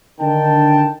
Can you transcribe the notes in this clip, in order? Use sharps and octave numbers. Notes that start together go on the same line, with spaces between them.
D3 D#3 G5 A5